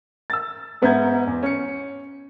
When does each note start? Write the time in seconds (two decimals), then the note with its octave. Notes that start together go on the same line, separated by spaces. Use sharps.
0.30 E6 A6
0.82 G#2 B3 E5 A#5 G6 G#6
1.27 E2
1.43 C#4 C#7